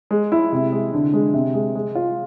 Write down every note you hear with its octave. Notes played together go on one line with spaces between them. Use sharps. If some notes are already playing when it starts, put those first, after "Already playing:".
G#3
E4
C3
G#3
D3
G#3
C3
G#3
G#3
F4